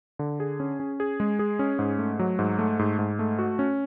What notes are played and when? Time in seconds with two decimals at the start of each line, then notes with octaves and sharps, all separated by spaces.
0.19 D3
0.40 G#4
0.60 C#4
0.80 C#4
1.00 G#4
1.20 G#3
1.39 G#4
1.59 C#4
1.79 G#2
1.99 A3
2.19 F#3
2.39 G#2
2.59 A3
2.79 G#2
2.99 G#2
3.19 A3
3.39 F#4
3.59 C#4